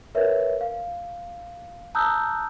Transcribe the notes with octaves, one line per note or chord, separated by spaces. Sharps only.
A#4 B4 C#5 E5
F5
A5 A#5 D#6 E6 F#6 G6